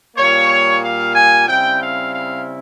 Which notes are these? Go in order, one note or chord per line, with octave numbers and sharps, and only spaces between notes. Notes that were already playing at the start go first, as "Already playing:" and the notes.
A#2 G3 A#3 C#5
F5
G#5
C#3 G3 C4 E4 G5
F5
F5